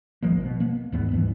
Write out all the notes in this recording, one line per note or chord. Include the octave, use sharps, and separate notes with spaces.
D#1 A1 F3 A#3
B2
A#3 B3
D#2 G#2 B3
D1 G#2 E3